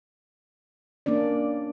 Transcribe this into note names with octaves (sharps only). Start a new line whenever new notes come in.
A#3 C#4 D4 D5